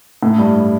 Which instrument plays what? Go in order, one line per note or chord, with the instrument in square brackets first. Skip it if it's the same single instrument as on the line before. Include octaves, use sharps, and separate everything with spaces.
[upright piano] A2
G2